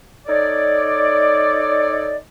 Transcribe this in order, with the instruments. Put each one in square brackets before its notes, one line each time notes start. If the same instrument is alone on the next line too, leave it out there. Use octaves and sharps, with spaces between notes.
[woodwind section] D#4 A4 C#5 D5